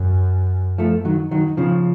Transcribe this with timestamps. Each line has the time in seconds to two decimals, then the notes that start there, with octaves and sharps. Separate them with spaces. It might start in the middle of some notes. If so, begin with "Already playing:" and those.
Already playing: F#2
0.78 F3 A3
1.05 D#3 F#3
1.31 D#3 F#3
1.57 C#3 F3